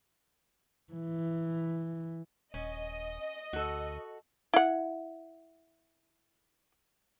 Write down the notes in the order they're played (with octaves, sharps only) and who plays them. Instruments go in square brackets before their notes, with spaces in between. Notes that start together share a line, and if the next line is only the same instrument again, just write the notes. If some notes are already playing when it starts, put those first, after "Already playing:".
[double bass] E3
[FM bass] D#1 [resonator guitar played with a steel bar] C#4 [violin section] D#5
[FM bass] D2 [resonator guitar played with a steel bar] F#4 A4
[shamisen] E4 F#5